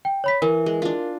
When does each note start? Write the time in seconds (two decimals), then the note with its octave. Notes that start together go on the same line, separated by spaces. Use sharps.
0.05 G5
0.24 C#5 B5 B6
0.42 E3 A#4
0.66 G#3
0.82 D4 F4